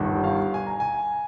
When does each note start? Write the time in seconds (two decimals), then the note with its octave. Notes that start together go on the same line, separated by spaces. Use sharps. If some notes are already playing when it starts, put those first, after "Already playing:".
Already playing: G1 G2 D#3
0.24 F5
0.54 G#5
0.66 A#5
0.80 G#5